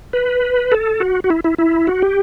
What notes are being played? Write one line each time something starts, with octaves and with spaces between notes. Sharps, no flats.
B4
A4
F#4
F#4
E4
E4
E4
F#4
G4